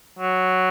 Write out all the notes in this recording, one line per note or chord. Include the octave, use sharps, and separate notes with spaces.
F#3